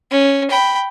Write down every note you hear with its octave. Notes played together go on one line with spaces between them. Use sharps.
C#4
G5 B5